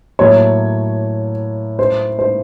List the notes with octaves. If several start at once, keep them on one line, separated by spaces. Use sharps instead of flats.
A2 F#3 A#3 C#5
C5
C5